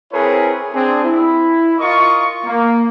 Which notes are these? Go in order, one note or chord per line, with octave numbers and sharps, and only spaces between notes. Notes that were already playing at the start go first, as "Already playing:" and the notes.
C4 E4 G#4 A#4 B4 C#5
C4 D4 G#4
E4
F4 A#4 D#5 C#6
A#3